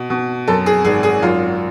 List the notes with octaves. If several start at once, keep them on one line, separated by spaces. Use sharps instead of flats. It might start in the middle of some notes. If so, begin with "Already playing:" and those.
Already playing: B2
B2
F#2 A4
G#4
G#1 G#4
G#4
F#2 F4